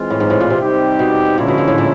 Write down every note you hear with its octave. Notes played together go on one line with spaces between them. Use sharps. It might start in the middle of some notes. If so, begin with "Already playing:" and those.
Already playing: E3 G#3 C4 F4
A2
G#2
A2
A#2
C3
G3 C4 D#4 G4
B2
A#2 D3 F3 G#3 C#4 E4
B2
A#2
A2
A#2